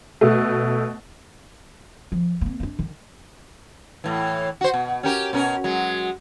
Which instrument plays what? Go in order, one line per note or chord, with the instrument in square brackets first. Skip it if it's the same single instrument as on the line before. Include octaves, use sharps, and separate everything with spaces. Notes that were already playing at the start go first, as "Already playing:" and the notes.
[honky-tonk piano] B2 A3
[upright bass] F3
A#3 C4
C4 D4
D#3
[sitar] A2 E3
F#4 C5
B2
C#4 G4 A#4
B2 C#4 A#4
F#3 G#3